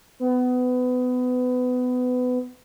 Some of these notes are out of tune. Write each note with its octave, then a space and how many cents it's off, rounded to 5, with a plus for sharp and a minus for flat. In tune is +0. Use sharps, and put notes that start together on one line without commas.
B3 +25